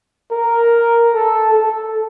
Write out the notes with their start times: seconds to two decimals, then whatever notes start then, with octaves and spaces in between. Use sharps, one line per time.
0.31 A#4
1.14 A4
1.54 A4